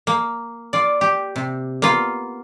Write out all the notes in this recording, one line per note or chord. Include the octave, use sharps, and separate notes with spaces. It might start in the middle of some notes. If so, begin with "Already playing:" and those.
A#3
F4 D5
G4
C3
A#3 B3 F4